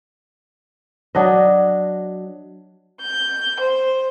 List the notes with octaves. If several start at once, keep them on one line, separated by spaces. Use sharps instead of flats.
F#3 D4 D#5
G6
C5